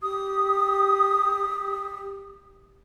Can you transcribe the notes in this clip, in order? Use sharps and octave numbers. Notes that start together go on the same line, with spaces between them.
G4 D#6